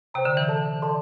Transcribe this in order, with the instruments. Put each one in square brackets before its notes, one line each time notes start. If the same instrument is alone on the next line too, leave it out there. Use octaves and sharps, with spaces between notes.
[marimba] C3 [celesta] C5 G5 A#5
[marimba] D3
E3
[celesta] A4 D5 A5
A4 D5 A5 C6